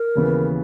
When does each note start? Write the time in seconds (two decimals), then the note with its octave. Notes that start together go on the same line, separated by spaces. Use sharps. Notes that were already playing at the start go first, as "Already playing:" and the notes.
Already playing: A#4
0.15 D#2 C#3 E3 B3